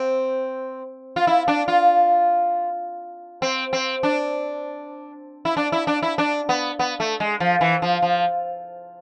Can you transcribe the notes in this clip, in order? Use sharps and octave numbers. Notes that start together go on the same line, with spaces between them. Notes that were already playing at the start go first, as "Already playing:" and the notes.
Already playing: C4
F4
E4
D4
F4
C4
C4
D4
E4
D4
E4
D4
E4
D4
B3
B3
A3
G#3
F3
E3
F3
F3